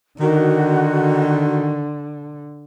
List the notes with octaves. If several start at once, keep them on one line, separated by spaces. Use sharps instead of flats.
D3 D#3 F#4